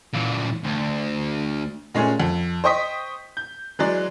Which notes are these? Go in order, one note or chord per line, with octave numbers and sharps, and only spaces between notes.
A#2 E3
D2
A#2 G#3 A3 C#4
F2
C5 D#5 G5 C#6 D#6 B6
G6
E3 F#3 G#3 D5